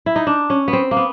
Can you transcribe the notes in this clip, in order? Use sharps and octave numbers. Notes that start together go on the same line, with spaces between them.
E4
D#4
D4
C#4
B3
C4
A#3
B3